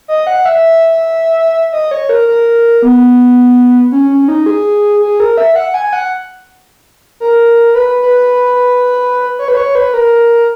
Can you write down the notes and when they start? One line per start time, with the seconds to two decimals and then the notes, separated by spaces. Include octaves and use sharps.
0.08 D#5
0.27 F#5
0.45 E5
1.72 D#5
1.91 C#5
2.09 A#4
2.28 A#4
2.82 B3
3.92 C#4
4.10 C#4
4.28 D#4
4.46 G#4
5.01 G#4
5.20 A#4
5.37 E5
5.56 F#5
5.74 G#5
5.93 F#5
7.20 A#4
7.74 B4
8.02 B4
9.39 C#5
9.48 B4
9.57 C#5
9.75 B4
9.94 A#4